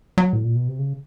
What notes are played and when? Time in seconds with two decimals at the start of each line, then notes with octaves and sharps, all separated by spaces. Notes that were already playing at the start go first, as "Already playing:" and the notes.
0.18 F#3
0.33 A2
0.44 A#2
0.56 B2
0.68 C3
0.79 C#3